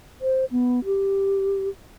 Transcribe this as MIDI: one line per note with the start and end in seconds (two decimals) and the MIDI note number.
0.21 0.45 72
0.51 0.84 59
0.85 1.69 67